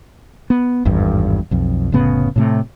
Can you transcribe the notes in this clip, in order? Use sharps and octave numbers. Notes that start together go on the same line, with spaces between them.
B3
G#1 E2 G2
B1 F2
F1 A2 C#3 B3
A2 C3 A3